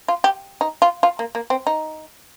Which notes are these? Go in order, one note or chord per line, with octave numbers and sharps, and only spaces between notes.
F4
G4
D#4
F4
F4
A#3
A#3
C4
D#4